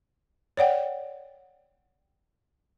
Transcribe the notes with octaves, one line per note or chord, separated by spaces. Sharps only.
C#5 D5 F#5 G5